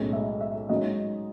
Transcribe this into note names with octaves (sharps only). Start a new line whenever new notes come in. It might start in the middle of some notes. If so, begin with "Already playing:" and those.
Already playing: B1 A2 G#3 C#4
E5
E5
G#2 F#3 C#4 D#5